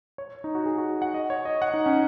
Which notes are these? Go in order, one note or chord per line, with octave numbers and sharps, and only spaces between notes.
C#5
D#4
F#4
G#4
F#4
F#5
D#5
C#5
D#5
F#5
D#4
C#4